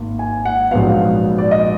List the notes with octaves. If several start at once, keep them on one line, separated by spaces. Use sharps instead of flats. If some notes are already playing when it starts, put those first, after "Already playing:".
Already playing: G#1 G#2 A#3
G#5
F#5
A#1 G#2 F#3 B3 F5
D5
D#5